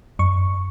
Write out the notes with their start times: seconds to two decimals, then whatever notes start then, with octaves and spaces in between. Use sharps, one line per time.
0.19 F#2 C#6